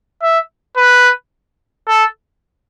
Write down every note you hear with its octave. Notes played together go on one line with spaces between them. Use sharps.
E5
B4
A4